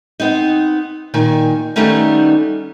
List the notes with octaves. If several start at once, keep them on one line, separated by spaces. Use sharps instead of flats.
B3 C4 D#4
A#2 D#3 G#5
D#3 G3 A3 B3 C#4 D#4